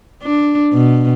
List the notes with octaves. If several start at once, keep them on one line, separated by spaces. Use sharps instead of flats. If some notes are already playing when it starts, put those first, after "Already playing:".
D4
B2